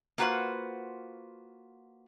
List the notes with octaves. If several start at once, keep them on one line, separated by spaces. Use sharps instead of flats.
A#3 F4 F#4 B4 C5 F#5